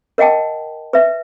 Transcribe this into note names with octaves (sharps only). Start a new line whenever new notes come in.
A#4 D#5 F#5 G5 A5
B4 E5